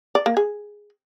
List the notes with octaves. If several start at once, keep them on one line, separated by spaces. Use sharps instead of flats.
D5
A#3
G#4